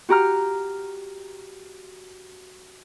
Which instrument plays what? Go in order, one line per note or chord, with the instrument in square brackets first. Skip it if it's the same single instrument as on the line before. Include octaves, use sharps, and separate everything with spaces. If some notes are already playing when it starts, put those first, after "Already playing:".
[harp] F#4 G4 A#5 F6